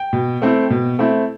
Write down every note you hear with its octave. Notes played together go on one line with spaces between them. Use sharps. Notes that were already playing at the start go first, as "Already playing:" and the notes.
Already playing: G5
B2
A3 C4 E4
B2
A3 C4 E4